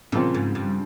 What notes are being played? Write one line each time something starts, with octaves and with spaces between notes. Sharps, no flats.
A#2 C#3 F3 C4
G#2
G2